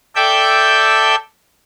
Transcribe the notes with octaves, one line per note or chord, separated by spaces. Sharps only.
A4 D5 E5 G5 G6